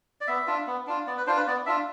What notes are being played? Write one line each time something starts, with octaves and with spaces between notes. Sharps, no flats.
D5
B3 E5
D4 F4
B3
D4 F4
B3 D5
B4
D4 F4 C5
B4
B3 D5
D4 F4 E5